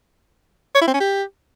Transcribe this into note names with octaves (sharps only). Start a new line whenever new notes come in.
C#5
E4
C4
C#4
G4